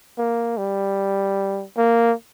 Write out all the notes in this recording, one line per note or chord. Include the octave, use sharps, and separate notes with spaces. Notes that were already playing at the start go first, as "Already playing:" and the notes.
A#3
G3
A#3